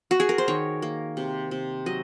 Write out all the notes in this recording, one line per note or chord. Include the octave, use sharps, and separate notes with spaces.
F#4
G#4
A#4
C5
D#3 C#5
A#3
C3
C3
F#3 D#5